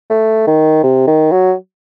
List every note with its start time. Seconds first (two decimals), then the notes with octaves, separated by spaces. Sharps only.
0.10 A3
0.47 D#3
0.83 C3
1.07 D#3
1.32 F#3